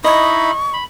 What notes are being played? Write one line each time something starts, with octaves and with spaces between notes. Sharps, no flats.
D#4 E4 D#5 B5 C#6
B5